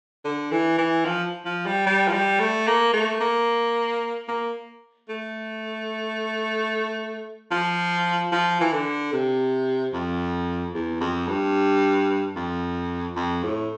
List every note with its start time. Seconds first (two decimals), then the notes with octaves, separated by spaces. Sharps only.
0.25 D3
0.52 E3
0.78 E3
1.05 F3
1.46 F3
1.66 G3
1.86 G3
2.08 F3
2.13 G3
2.40 A3
2.67 A#3
2.93 A3
3.21 A#3
4.28 A#3
5.09 A3
7.51 F3
8.32 F3
8.61 E3
8.72 D3
9.13 C3
9.93 F2
10.74 E2
11.01 F2
11.28 G2
12.36 F2
13.16 F2
13.43 A2